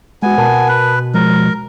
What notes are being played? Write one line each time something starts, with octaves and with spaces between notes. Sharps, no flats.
G#3 B3 F#4 G#5
B2 A#4 A5
B4
F3 G#3 A#4